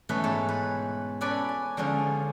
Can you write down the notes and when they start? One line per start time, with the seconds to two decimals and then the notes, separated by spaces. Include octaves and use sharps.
0.09 B2 E3 A3 C#4 B4
0.24 G#2 C#5 A5
0.49 B4
1.21 C#4 A4 B4 D5 G#5
1.49 G#5
1.77 D3 F3 G#3 C#4 D#4